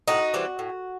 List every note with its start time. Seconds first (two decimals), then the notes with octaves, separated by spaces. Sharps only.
0.08 A2 D#4 F#4
0.34 E3 G3 C4
0.59 A2